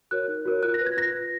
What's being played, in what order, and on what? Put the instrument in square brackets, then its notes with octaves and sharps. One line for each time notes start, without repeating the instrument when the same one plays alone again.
[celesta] F#4 A#4 C#5 F#6
D#4
F#4 A#4 C#5
F4 F#6
A#6
B4
G#6
F4 A#6
B4